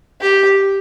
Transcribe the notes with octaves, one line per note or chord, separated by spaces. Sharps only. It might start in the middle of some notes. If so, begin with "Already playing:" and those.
G4